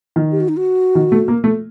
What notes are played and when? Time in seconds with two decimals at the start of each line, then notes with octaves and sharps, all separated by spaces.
0.16 D#3
0.32 G4
0.40 F#4
0.49 D#4
0.57 F#4
0.95 D#3
1.12 A3
1.28 A#3
1.44 A3